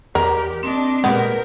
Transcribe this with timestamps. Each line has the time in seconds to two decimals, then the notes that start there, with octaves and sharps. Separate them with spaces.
0.15 E2 G4 A#4
0.63 C4 D4 D#5
1.04 A#2 G#3 B3 G4 A#4 B4